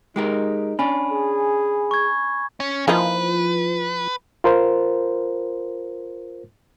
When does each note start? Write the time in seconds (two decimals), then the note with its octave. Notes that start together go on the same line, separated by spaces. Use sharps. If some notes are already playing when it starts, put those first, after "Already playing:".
0.16 G#3 D#4 G4 A#4
0.79 C#4 D4 G#5 B5
1.11 G#4
1.91 C#6 G#6
2.60 C#4
2.88 E3 F3 A#3 D#4 B4
4.44 F4 A#4 C5